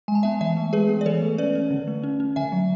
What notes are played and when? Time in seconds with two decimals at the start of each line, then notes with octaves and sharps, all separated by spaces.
0.08 G#3 G#5
0.15 A5
0.23 B3 E5 G#5
0.41 E3 E5 G#5
0.57 A3
0.73 G#3 G#4 B4
0.89 B3
1.01 D5
1.06 E3 A4 C#5
1.22 A3
1.38 C#4 B4 D5
1.55 C#4
1.71 D3
1.88 A3
2.04 C#4
2.20 C#4
2.36 D3 E5 G#5
2.52 F#3